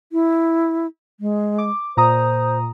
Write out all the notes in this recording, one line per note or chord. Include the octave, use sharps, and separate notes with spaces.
E4
G#3
D6
A#2 C5 A#5 D#6